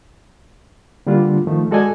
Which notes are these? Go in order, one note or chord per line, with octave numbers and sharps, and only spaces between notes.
D3 G3 A#3 D4 F4
D#3 F3 A3
G#3 F#4 A4 D5 D#5 G#5